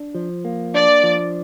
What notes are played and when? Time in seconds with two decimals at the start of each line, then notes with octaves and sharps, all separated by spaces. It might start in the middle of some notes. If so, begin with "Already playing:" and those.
Already playing: D4
0.15 F3
0.45 A#3
0.74 D4 D5
1.03 F3